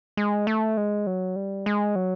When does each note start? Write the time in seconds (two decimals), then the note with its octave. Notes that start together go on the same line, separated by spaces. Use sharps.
0.17 G#3
0.47 A3
0.77 G#3
1.07 F#3
1.36 G3
1.66 G#3
1.95 F#3